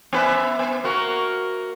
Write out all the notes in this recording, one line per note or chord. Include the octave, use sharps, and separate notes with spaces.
B3 B4 E5
B3
A#3 F#4 A#4